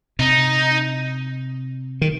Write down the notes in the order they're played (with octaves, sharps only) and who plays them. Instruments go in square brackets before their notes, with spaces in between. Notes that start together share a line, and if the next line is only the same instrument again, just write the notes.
[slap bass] C3 [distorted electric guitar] D#4
[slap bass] D#3